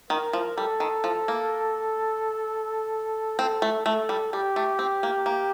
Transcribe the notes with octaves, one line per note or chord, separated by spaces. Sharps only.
D#3 A#4
F3
G3 A4
D#3
F3
A#3
C4 A4
A3
A3 A4
G3
G3 G4
A3
C4
A#3
A#3